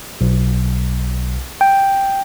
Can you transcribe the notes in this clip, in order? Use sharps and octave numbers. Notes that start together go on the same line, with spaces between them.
B1
G5